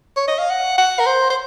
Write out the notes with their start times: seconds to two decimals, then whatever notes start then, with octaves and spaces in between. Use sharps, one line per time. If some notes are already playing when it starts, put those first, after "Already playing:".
0.17 C#5
0.28 D#5
0.39 F5
0.50 F#5
0.78 F#5
0.99 A#4
1.06 C5
1.30 C5